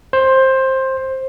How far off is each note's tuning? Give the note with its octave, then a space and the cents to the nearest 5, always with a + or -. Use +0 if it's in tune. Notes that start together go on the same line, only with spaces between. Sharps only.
C5 +15